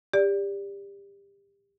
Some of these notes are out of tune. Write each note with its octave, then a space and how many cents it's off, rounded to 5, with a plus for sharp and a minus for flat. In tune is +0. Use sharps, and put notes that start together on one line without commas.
G4 +25 D5 -15